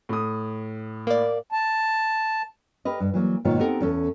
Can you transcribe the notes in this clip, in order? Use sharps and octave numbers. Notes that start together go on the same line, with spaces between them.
A2 D#6
A#3 D5
A5
G4 A#4 B4 D#5
G2
E3 F#3 A#3
G#2 B2 D#3 A#3 F4 C#5
B3 C4 D#4 G4 A4 A#4
E2 C#4 A4